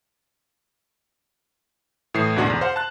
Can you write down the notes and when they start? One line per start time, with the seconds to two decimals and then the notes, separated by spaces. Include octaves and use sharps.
2.14 A2 E3 D#6 C7
2.36 D2 G#2 B2 D4 F#4
2.50 E2
2.61 C5 F5 F#5
2.76 A5 F#6